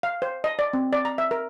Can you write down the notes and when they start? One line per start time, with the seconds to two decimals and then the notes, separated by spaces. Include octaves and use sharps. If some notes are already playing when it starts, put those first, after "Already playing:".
0.03 F5
0.22 C5
0.44 D#5
0.59 D5
0.73 C4
0.93 D5
1.05 A#5
1.18 E5
1.31 A#4